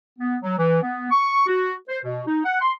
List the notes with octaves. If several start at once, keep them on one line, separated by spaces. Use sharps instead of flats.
B3
F#3
E3
B3
C#6
F#4
C5
B2
D#4
F#5
C6